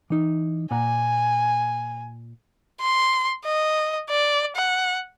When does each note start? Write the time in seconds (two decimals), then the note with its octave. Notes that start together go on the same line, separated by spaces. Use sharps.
0.10 E3 D#4
0.71 A#2 F#5 G#5 A#5
2.81 C6
3.45 D#5
4.10 D5
4.56 F#5